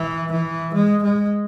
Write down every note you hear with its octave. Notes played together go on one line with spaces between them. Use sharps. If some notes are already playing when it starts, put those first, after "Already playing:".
Already playing: E3
E3
G#3
G#3